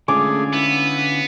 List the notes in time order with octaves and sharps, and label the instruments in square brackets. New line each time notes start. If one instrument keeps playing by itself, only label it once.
[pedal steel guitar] D3 C#4 F4 [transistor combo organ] G#3 A3 G#4 [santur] D6
[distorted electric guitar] B3 [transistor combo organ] E4